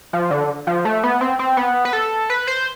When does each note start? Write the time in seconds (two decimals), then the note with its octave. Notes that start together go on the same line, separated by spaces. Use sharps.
0.13 F3
0.31 D3
0.67 F3
0.85 A3
1.03 B3
1.21 C4
1.39 C4
1.57 B3
1.85 B4
1.93 A4
2.30 B4
2.47 C5